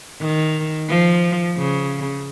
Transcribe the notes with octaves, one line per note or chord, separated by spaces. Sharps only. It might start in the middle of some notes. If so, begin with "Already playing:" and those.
D#3
F3
C#3